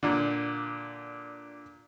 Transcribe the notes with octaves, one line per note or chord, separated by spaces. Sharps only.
A#2 D3